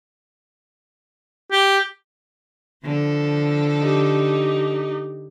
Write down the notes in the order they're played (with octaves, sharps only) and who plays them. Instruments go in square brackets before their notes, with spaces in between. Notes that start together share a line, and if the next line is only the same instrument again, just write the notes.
[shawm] G4
[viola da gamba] D3 F3 A4
[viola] D#4 G4